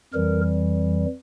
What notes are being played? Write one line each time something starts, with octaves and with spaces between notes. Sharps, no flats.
F2 E3 G3 A#4